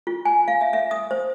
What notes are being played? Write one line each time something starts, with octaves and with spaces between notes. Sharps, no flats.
F4
G#5
F5
E5
E5
D#6
C5